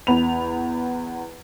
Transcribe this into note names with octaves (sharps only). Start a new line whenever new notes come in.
E2 B5 F7